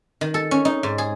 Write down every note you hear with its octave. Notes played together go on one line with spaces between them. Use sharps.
D#3
A4
C#4
D#4
G#2
G#4